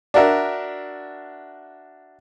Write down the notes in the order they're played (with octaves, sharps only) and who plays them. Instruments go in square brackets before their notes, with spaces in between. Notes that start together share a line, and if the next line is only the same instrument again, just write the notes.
[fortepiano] D4 F#4 A#4 E5